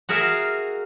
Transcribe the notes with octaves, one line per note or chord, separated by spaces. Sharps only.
F#4 G#4 A#4 E5 F5